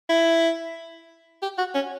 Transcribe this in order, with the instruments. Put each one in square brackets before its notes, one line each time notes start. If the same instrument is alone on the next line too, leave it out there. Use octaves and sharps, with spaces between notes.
[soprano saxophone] E4
G4
F#4
C#4